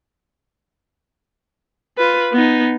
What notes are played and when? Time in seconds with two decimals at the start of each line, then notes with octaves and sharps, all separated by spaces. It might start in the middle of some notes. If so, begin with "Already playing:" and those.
1.98 F4 B4
2.32 B3 D#4